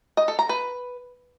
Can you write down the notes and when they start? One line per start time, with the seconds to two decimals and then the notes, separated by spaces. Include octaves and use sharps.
0.17 D#5
0.28 A4
0.39 A#5
0.49 B4